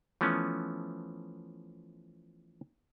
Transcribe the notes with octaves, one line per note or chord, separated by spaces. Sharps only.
E3 F3 A3 B3 C#4